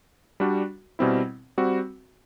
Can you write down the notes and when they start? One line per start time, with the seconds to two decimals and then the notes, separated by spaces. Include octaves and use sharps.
0.40 G3 D4 F#4
0.99 B2 G3 C4 E4
1.57 G3 C4 F#4